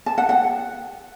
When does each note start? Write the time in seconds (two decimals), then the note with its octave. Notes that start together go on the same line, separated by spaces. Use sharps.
0.06 A5
0.18 F#5
0.29 F#5